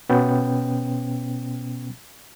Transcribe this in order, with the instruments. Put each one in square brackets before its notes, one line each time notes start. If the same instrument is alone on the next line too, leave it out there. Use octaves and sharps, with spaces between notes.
[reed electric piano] B2 B3 C#4 G5